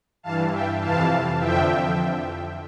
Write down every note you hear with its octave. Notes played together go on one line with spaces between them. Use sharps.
G2 E3 F5 A5
E5 G5
F2 C3 E3 F5 A5
F2 D3 F3 E5 G5